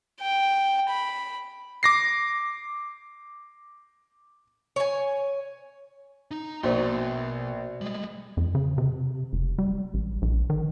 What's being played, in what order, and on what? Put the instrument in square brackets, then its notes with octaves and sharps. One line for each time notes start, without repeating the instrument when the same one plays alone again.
[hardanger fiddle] G5
B5
[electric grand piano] D6 A#6 C7
[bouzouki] C#5 G#5
[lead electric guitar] D#4
[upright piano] A#1 [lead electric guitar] B2 C6 [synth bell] F#4 C5 D5
[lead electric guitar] G3 G#3 [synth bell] F#7
[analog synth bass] F2
C#3
C3
F1
G3
A1
A#1
D#3